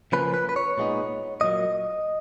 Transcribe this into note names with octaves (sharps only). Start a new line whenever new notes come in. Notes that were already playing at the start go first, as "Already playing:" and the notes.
C#3 F3 A#3 C#4 B4
B4
B4
C#5
A#2 G#3 B3 D#4
A#2 F#3 A#3 D#5